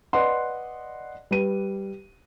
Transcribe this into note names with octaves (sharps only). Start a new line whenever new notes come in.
B4 D5 D#5 F#5 C6
G3 B4 D#7